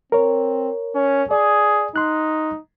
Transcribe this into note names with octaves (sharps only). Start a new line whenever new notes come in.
C4 A#4 C#5
C#4
G#4 D5
D#4 C6 F#6